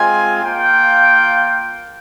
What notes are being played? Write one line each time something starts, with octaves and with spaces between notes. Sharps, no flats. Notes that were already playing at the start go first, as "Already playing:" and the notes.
Already playing: G#3 C4 F4 G#5
A#3 F4 G5